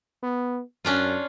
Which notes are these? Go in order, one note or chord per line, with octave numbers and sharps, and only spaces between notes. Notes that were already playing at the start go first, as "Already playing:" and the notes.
B3
F#2 C#4 D4 F4